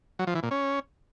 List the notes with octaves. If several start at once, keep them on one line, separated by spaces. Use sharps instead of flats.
F#3
F3
E3
A#2
C#4